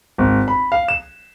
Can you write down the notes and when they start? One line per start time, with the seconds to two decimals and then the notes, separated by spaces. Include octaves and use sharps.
0.18 G#1
0.48 B5
0.72 F5
0.88 E7